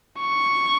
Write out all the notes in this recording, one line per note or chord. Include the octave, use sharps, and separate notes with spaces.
C#6